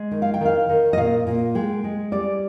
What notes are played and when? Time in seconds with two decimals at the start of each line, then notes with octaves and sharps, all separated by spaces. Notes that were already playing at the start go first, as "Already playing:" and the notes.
Already playing: G#3
0.11 D#3
0.22 F5
0.34 G5
0.41 D#3 F5
0.69 D#3
0.93 D#5
0.97 A#2 F5
1.27 A#2
1.55 G#3 G5
1.84 G#3
2.12 G3 D5